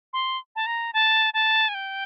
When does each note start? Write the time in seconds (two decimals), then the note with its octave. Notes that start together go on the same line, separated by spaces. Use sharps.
0.13 C6
0.56 A5
0.66 A#5
0.93 A5
1.34 A5
1.69 G#5
1.74 G5